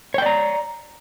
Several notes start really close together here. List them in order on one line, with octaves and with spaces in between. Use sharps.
C#5 G5 D5 A#5